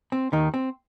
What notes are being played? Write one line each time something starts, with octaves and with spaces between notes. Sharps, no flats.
C4
D#2 D#3 D#4
C4